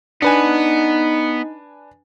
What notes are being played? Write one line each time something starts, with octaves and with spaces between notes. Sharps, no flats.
B3 D4 D#4 B4 G#5